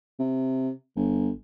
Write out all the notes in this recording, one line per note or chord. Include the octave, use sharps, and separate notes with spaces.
C3
G1